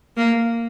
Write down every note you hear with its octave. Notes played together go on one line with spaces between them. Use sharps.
A#3